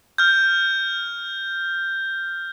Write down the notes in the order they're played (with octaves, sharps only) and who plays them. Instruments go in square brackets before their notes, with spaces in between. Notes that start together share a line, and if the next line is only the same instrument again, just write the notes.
[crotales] F6 G6